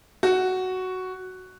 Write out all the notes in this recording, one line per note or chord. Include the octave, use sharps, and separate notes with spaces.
F#4